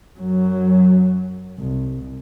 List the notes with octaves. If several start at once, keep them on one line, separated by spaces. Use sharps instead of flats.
F#2 F#3
C2